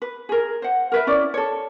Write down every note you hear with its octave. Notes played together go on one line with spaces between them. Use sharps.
B4
G#4 A#4
C5 F#5
A#4 B4 E5
C#4 E4 D5
A4 C#5